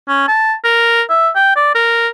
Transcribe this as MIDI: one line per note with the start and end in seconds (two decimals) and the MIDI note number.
0.08 0.26 61
0.28 0.54 81
0.64 1.02 70
1.09 1.29 76
1.35 1.53 79
1.56 1.72 74
1.75 2.08 70